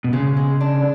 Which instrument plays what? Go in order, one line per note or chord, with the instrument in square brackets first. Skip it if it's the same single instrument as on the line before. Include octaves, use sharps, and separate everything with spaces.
[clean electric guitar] B2
[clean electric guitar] C#3 [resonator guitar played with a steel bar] G#3
[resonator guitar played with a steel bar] G#3
D4